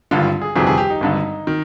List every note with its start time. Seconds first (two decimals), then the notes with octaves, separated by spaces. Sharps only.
0.11 G#1 G2 D3 F4
0.42 G#4
0.55 G1 F2 C3 D#3 G#4
0.67 G#4
0.78 G4
0.90 D#4
1.01 G#1 G2 D3
1.47 D#3